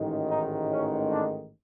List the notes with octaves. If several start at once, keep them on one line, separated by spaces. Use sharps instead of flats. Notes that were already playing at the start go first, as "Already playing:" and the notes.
Already playing: A1 G#2 D#3
D#4
C#4
D4